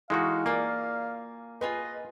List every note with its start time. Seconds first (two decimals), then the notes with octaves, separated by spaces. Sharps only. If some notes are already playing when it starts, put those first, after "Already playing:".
0.10 E3 G#3 D#4 F#4 A4 F5 C#6
0.46 A#3 F4 A#4 D5 G#5
1.61 F4 G#4 B4 D#5 C6